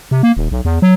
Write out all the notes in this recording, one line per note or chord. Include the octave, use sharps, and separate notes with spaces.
C3
A#3
D#1
B1
E2
F#3